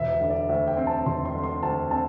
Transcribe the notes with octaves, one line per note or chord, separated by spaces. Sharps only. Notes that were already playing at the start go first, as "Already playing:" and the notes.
Already playing: E1 E5
E5
D3
D5
D2 E5
G5
C4
A5
E1 C6
C6
D3
C6
D2 A5
C4 A5